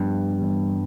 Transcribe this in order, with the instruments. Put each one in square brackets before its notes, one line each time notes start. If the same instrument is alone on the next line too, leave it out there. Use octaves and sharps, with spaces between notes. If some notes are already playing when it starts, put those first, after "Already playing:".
Already playing: [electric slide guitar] G2 [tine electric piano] F3 B3 D4 G4
[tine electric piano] E3 G3 B3